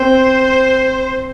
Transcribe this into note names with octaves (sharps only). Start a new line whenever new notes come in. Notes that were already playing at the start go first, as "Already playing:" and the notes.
Already playing: C4 C5